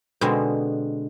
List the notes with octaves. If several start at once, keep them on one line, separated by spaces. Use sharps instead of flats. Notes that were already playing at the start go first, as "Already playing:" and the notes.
B2 D3 G#3 C4